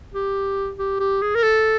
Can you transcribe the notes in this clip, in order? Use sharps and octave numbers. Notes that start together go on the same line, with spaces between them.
G4
G4
G4
G#4
A#4
A4